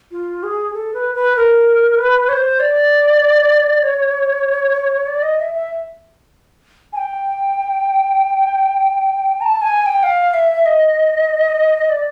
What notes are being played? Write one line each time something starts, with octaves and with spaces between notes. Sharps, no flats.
F4
G#4
A4
B4
B4
A#4
B4
C#5
C5
D5
C#5
D5
D#5
E5
E5
G#5
G5
A#5
A5
G#5
G#5
G5
F5
E5
D#5
D5